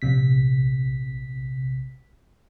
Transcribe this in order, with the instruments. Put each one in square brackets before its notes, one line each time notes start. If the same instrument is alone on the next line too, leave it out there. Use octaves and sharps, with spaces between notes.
[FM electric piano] A#1 C3 B6